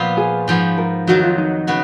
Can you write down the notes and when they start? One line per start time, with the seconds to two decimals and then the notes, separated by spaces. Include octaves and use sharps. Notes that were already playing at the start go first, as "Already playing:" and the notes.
Already playing: A#2 F3 B3 F4
0.17 G#4
0.48 G#2 F3 B3
0.78 A#4
1.07 F2 D#3 F#3 F#4
1.23 F4
1.38 D#4
1.67 C#3 B3 F#4